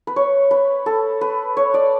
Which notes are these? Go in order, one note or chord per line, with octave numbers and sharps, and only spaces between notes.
B4
C#5
B4
A4
B4
C#5
D5